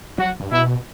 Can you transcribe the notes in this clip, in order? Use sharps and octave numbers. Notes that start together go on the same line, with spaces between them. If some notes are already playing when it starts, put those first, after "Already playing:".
F#3 F#4
G2
B2 E4